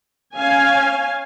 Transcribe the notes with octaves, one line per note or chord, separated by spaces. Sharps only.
C#4 F5 G#5